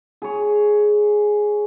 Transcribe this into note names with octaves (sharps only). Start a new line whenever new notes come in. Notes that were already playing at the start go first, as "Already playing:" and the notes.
G#4 C#5